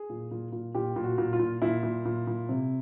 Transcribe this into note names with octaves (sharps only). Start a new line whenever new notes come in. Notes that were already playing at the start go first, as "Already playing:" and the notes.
Already playing: G#4
A#2
A#2
A#2
A#2 G4
A#2
F#4
A#2
F4
A#2
A#2 E4
A#2
A#2
A#2
C3